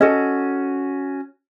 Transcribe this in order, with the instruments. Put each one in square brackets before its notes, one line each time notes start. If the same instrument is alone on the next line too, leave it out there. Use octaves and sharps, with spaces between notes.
[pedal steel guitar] C#4 F#4 [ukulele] A4 D#5